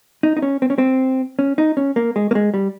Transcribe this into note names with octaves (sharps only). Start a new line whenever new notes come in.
D#4
D#4
C#4
C4
C#4
C4
C#4
D#4
C#4
A#3
G#3
A#3
G#3
G3